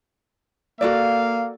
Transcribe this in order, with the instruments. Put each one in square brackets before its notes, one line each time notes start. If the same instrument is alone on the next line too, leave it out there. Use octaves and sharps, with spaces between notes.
[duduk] A#3 [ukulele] F#4 A4 D5 [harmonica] F5